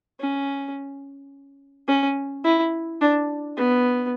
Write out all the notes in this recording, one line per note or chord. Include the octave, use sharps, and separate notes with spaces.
C#4
C#4
E4
D4
B3